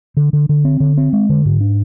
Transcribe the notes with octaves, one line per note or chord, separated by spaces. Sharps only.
D3
D3
D3
C4
D3
C4
G#3
D3
G#2
D4